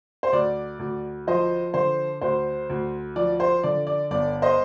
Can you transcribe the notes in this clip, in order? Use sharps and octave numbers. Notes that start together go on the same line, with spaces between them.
C5
D2 D5
D2
F3 C5 D#5
D3 C5
D2 C5
D2
F3 D5
C5
D3 D5
D5
G1 D5
C5 D#5